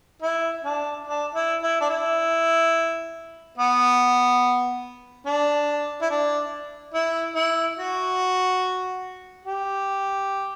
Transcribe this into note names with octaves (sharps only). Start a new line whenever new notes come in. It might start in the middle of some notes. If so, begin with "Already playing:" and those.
E4
D4
D4
E4
E4
D4
E4
B3
D4
E4
D4
E4
E4
F#4
G4